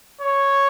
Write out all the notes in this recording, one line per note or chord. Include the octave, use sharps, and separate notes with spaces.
C#5